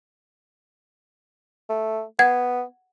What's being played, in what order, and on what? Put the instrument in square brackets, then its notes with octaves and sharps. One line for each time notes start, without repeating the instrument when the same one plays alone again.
[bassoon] A3
[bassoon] B3 [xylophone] F#5 G#6